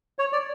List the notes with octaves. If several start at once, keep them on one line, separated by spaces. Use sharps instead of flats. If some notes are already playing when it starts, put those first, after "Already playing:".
C#5
D5